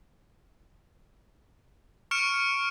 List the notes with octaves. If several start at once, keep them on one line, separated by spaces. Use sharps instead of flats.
C#6 F6 C#7 D7 E7